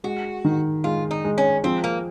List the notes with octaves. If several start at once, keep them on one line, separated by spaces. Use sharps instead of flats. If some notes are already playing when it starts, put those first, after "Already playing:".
G#3 F#4
D#3
G#3 F4
D#4
G#3
C#4
F3 C4
A#3